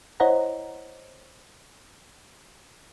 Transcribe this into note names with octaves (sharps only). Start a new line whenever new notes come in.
E4 C5 C#5 D#5 F#5 A#5